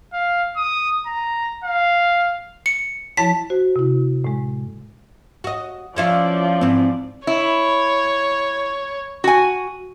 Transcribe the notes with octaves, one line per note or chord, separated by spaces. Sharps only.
F5
D#6
A#5
F5
C#7
F3 E4 C#5 A5 B6
F#4 C5
C3 E4
A2 G#3
F#4 D#5
F3 C#4 E4 F4 D5
G#2 E3 C4
E4 C#5
F#4 G#5